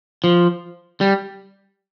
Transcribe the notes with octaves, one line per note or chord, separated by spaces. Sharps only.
F3
G3